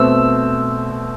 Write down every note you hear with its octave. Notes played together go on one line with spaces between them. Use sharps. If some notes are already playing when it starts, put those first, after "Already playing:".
Already playing: B2 A3 C4 E6